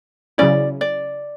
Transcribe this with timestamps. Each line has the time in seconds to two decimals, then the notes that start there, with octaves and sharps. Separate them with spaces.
0.38 C#3 F#3 C#4 E4 D5
0.81 D5